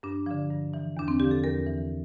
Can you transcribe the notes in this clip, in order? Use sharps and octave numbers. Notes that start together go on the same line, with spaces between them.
G2 D4
D3 F3
G2
E3
E2 D4
C4
D3 F3 G4
A4
E2 A#4
E3